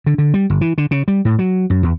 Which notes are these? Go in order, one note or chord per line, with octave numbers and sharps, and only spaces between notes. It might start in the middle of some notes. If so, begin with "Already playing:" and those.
D3
D3
G3
G1
E3
D3
C#3
G3
A2
F#3
F#2
E2